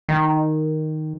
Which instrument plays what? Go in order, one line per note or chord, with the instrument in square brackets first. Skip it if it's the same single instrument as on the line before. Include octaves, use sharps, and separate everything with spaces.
[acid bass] D#3